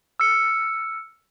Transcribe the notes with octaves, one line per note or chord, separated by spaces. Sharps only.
E6 F6 C#7